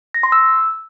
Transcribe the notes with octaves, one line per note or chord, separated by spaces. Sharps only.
A#6
C6
E6